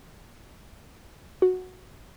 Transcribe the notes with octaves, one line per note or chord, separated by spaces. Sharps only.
F#4